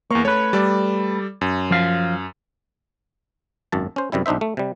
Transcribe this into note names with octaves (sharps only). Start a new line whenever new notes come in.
E2 A#3 C#6
A3 B4 C#5
G3 A4 D5
F#2
F3 F5
G#1 F#2 A5
C#4 C5
F#2 C3 G3 E4
B1 D4 D#4 C5 E5
A3
C3 G3